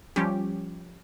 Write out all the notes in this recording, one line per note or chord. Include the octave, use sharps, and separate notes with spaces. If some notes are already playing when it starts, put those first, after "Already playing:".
F3 G3 C#4 G4